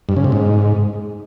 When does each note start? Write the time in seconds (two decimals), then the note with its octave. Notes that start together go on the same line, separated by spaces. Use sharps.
0.09 G2
0.17 C#3
0.24 C3
0.32 G#2